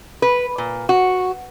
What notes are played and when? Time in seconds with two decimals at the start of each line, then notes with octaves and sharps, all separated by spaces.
0.22 B4
0.58 A#2
0.89 F#4